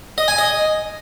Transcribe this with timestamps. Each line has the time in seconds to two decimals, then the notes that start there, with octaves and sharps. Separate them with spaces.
0.18 D#5
0.28 G#5
0.38 D#5